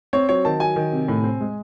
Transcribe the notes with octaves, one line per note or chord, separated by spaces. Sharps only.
C4 C#5
F#3 C#5
D#3 A5
F#3 G#5
D#3
C3
A2
C4
G#3